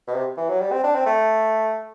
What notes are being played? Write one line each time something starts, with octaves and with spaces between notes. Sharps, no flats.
B2
C3
E3
F#3
G3
C4
D4
C4
A3